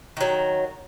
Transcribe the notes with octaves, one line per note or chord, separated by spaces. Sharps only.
D#3 F#3